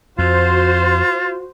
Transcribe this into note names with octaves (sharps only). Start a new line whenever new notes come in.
F2 F4 F#4 C5